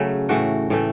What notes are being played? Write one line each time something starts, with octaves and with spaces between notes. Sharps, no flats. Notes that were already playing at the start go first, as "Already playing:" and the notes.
Already playing: C#3 F#3 A3
A2 E3 A3 F#4
A2 E3 A3